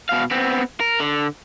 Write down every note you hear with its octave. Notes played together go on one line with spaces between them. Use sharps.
B2 F5
B3 C4
A#4
D3